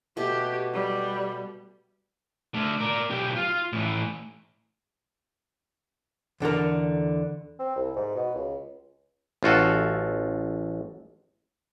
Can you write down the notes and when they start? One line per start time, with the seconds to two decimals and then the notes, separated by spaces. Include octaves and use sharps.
0.17 B2 A3 G4
0.73 G3
2.54 D3 A3
2.78 A#4 D5
3.10 B1 G4
3.36 F4
3.73 A2 E3
6.40 E2 D3 A4 A#4
7.59 C4
7.76 C2
7.96 G#2
8.15 B2
8.34 C#2
9.43 A1 F4 F#4 A4